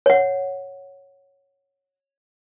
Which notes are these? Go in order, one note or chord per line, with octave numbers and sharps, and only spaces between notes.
C#5 F#5